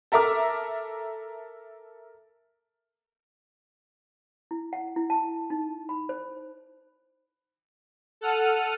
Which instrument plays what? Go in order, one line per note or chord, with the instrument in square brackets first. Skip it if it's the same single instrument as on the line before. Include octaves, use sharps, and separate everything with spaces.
[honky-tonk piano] A4 A#4 E5 A#5 D6 F6
[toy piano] E4
F#5
E4
A5
D#4
B5
C5
[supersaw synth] A4 F#5 F6 D#7